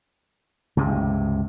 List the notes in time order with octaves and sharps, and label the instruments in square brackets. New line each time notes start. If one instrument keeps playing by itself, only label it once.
[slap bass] C#2 G2 C3